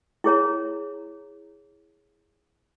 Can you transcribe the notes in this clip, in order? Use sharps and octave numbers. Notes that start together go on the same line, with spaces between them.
E4 G#4 C#5 A#5